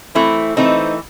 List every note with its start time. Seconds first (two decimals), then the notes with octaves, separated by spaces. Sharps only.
0.15 E3 A3 C4 E4
0.57 E3 A3 C4 D#4